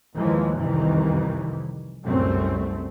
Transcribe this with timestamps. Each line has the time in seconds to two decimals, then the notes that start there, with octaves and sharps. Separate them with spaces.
0.15 D#2 E3 F3 G#3 A#3
0.58 C2 F2 C3 D#3 E3 G3
2.05 C2 F#2 A2 G3 A3 C4